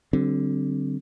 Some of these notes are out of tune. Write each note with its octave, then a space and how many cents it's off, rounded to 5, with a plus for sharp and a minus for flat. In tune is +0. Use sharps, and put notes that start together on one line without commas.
D3 +0 G3 -40 C4 +0